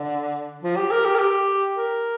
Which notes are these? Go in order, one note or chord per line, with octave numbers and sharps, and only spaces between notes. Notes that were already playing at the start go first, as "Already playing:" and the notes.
Already playing: D3
F3
G4
A#4
G4
A#4
G4
A#4